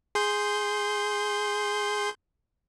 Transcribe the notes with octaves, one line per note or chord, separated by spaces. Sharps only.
G#4 C6 G6